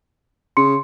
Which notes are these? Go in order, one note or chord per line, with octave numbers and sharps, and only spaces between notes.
C#3 C6 C#7